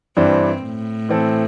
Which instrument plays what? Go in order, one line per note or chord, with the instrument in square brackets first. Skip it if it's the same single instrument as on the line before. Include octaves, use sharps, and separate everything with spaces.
[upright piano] G2 E3 G3 D4 C5 [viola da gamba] C4
[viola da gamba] A2
[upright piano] E3 C4 A4